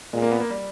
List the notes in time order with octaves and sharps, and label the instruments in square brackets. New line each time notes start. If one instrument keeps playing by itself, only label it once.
[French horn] A#2 [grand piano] G#3
[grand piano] A#3
B3
A#3
G3